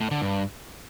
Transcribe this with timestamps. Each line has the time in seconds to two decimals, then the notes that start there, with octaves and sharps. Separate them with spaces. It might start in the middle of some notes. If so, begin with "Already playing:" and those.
0.01 A2
0.11 D3
0.22 G2